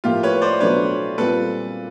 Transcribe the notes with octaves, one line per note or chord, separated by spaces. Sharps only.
A2 F3 A#3 F4 G4
B4 C#5
C5 D5
B2 F#3 A3 D4 B4 C#5
A#2 G3 C4 F4 A4 B4